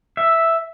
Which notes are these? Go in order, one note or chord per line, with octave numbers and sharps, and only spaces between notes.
E5